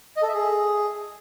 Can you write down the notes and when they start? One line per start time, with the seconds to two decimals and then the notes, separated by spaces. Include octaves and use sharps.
0.17 D#5
0.22 A4
0.28 E5
0.34 G#4